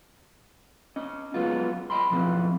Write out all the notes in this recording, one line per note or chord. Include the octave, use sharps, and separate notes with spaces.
C#4 D#5
F#3 G#3 B3 C#4 F4
D#5 G5 B5 C6
B1 F2 F3 C4 E4 B4